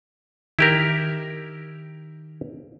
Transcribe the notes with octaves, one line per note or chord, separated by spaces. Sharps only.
D#3 E4 G4 A#4